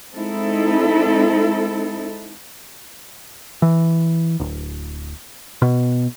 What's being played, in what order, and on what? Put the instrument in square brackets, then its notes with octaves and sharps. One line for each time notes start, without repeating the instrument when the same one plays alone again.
[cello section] G#3 C4 D#4 E4 A4
[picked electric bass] E3
D1
B2